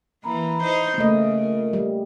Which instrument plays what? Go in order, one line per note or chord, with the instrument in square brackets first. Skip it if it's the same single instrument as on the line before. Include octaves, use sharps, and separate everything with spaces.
[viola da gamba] E3 A#3 [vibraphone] A#5 B5
[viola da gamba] D#4 C5
[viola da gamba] C#3 [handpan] A3 A#3 D#5
[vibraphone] F4 A#4
[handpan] G3